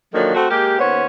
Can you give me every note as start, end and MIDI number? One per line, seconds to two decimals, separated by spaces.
0.13 0.32 50
0.13 0.32 51
0.13 0.32 53
0.13 0.32 54
0.13 0.32 58
0.35 0.47 57
0.35 0.47 60
0.35 0.47 66
0.50 0.78 56
0.50 0.78 58
0.50 0.78 67
0.79 1.06 39
0.79 1.06 59
0.79 1.06 61
0.79 1.06 72
0.79 1.06 73